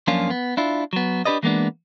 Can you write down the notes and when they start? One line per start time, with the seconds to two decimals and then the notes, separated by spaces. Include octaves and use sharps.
0.07 F#2 F3 A#3 C#4 D4 F4
0.30 B3
0.57 D4 E4 F4
0.93 F#3 B3
1.25 D4 D#4 G4 B4 D5 D#5
1.43 E3 G#3 A#3 B3 D4